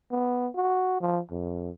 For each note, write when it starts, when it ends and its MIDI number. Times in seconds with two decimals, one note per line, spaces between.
0.11 0.48 59
0.55 0.97 66
1.01 1.19 53
1.31 1.70 41